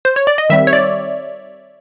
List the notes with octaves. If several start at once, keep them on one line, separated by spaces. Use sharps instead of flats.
C5
C#5
D5
D#5
D#3 G3 C4 E5
C#5
D5